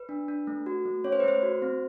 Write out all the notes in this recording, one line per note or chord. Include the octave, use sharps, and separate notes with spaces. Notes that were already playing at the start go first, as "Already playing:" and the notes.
Already playing: B4
D4
D4
A3
F#4
A3
C#4 C#5
C5
B4
A3 C5
F#4
C4